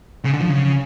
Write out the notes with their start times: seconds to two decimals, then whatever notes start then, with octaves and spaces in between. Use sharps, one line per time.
0.25 C#3
0.34 D3
0.42 F3
0.50 C#3